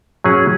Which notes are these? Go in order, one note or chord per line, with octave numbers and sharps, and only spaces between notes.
F#3 C#4 G#4